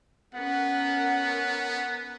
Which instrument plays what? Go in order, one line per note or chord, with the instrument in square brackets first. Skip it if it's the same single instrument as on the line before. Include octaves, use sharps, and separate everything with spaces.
[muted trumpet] B3 [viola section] C#4 A#4 F#5